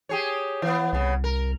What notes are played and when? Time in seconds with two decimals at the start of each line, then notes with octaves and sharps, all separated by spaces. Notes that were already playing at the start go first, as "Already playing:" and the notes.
0.09 G4 G#4 C#5
0.62 E3 B3
0.93 C2 C#3 B3
1.24 A#4